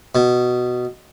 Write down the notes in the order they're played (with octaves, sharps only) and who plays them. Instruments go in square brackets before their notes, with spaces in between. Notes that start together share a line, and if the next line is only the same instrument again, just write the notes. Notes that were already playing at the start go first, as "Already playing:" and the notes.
[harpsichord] B2